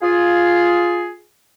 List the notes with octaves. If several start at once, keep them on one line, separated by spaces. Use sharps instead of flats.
F4 G#4